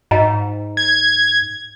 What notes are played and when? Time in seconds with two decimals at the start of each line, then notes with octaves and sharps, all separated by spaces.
0.11 G#2 D#5 G5 A#5
0.77 G#6